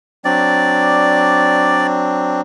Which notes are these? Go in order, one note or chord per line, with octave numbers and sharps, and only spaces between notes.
F#3 C4 D4 D5